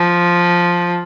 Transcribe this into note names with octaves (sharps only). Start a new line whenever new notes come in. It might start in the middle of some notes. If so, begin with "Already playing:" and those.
Already playing: F3